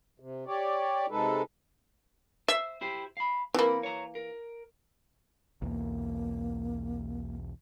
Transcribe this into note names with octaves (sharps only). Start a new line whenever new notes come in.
C3
G4 C#5 D5
C3 G#3 D#4 A4 B4
C5 E5
E4 G4 C5
F5 B5
E3 A#3 C4 B5
C#5 A#5
A#4
B1 E2 A#3